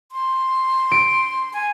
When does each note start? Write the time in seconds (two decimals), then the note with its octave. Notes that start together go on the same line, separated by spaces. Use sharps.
0.12 C6
0.91 D7
1.54 G#5